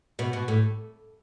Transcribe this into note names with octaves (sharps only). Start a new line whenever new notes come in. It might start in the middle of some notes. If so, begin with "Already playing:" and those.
B2
B2
A2